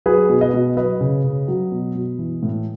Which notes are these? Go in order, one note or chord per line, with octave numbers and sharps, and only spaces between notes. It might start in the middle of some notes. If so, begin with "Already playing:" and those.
F#3 G#4 B4
B2
B4 D#5
B2
F#3 B4 D#5
C#3
C#3
F#3
B2
B2
E3
A2